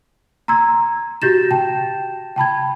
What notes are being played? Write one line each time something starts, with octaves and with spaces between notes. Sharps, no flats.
A#5 C6 E6 G#6
F#4 G4 G6 A6 A#6 E7
G5 A5 E7
G5 A5 B5 G#6